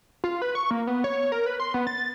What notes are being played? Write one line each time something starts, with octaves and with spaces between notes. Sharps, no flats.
F4
B4
C#6
A#3
B3
C#5
A#4
B4
C6
B3
A6